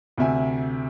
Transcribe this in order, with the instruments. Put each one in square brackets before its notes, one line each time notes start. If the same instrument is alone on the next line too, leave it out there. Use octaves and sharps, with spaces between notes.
[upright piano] D2 C3 E5 G#5